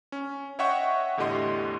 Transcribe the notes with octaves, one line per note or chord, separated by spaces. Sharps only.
C#4
C#5 D#5 E5 F#5 G5 C#6
E2 A2 D3 G4 D#5 C6